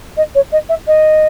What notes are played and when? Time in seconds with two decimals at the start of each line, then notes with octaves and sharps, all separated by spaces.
0.17 D#5
0.35 C#5
0.52 D#5
0.69 E5
0.87 D#5